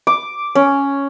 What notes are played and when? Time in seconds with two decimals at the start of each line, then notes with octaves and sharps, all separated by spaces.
0.07 D6
0.55 C#4